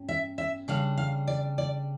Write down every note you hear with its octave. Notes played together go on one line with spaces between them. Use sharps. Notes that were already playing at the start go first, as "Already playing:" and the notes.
Already playing: G2 C#4
E5
E5
C#3 G3 D4 F5
F5
D5
D5